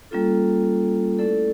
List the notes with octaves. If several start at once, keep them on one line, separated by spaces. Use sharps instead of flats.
G3 A#3 C#4 F4 A4
A3 C#4 E4 A4 D5